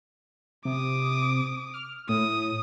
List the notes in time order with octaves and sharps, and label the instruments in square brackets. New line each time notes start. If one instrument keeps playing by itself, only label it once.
[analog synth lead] C3 [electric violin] D6 D#6
[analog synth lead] F6
[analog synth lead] A2 [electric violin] D#6